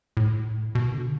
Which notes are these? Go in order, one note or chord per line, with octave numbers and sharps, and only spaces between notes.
A2
B2
D3